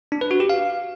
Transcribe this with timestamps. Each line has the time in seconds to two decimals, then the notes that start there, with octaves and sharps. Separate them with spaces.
0.12 D4
0.21 B4
0.31 F#4
0.40 G4
0.50 F5